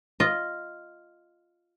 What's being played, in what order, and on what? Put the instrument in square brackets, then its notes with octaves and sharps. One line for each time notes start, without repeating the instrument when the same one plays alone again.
[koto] F4 D#5